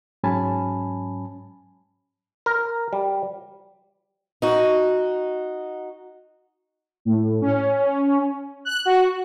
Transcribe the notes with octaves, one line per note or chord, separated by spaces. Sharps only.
G#2 F#3 C#4 G#5 A5 B5
A#4
G3
D#4 F#4
A2
C#4
F#6
F#4